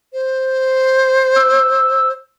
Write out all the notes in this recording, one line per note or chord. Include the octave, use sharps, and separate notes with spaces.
C5
E6